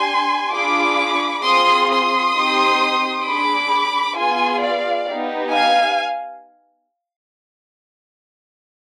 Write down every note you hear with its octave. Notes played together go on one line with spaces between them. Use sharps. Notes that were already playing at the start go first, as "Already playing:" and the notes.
Already playing: D4 G4 G#5 C6
D4 F4 G#4 B5 D6
C4 F4 G#4 C6 D#6
C6 D#6
C4 D#4 G4
D4 G#4 B5 D6
B3 F4 G#4 G#5 C6
D5 F5
B3 D#4 G4
F5 G#5